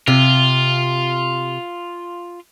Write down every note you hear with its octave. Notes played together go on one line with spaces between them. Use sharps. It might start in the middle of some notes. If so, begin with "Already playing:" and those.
C3 F4